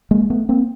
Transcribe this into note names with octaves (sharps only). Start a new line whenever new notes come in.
G#3 A#3
A3 B3
A#3 C4